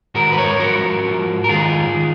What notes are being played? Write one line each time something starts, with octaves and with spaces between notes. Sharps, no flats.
G#2 D#3 F#4 A#4
B4
A#4 C#5
G#2 F3 F#4 A#4
G#2 F3
A#4
G#2 D#3 F4 G#4
D#3